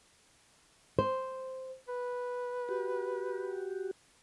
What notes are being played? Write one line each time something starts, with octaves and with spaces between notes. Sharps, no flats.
C5
B4
F#4 G4